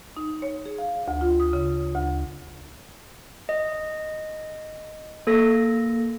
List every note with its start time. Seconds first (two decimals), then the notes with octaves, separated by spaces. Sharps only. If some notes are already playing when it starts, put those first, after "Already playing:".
0.17 D#4
0.42 C#5
0.66 G#4
0.78 F5
1.08 D2
1.21 F4
1.40 D#6
1.53 C#3
1.94 D2
3.49 D#5
5.27 A#3 A4 A#6